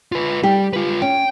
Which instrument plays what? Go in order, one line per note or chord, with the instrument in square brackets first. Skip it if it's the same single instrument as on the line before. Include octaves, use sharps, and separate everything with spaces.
[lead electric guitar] F4 B4
[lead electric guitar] G3 [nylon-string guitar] G4
[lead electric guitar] F4 B4
[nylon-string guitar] C#4 [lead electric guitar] G5